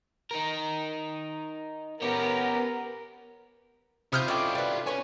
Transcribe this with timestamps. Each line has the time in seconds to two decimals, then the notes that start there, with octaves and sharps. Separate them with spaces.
0.31 D#4 A#4
2.02 B3 C#4 G4 A#4
4.13 C3 E4 F4 D#6 F6 G6
4.28 C#4 G4 A4 D5 D#5
4.55 G3 B4
4.87 C#4 B4 C#5 G#5